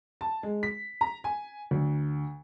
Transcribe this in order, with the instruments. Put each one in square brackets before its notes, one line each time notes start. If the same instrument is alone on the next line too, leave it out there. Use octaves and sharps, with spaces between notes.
[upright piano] A5
G#3
B6
A#5
G#5
D2